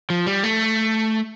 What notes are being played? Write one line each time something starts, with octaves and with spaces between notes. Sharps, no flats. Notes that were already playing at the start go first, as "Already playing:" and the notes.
F3
G3
A3